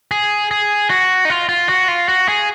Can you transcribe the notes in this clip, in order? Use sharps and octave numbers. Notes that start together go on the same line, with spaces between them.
G#4
G#4
F#4
D#4
F4
F4
F#4
F4
F#4
G#4